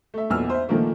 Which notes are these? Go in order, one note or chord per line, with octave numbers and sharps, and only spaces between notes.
A3 E5
B1 E2 A#2 E6 F6
C5 E5
A#2 D#3 F3 A3 A#3